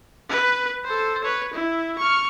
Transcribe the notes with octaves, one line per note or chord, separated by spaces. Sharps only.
B4
A4 C5
B4 C#5
E4
C#6 F6